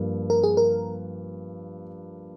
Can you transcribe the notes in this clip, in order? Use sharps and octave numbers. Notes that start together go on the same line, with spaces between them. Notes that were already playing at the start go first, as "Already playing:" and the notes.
Already playing: G2 F3 A#3
A#4
G#4
A#4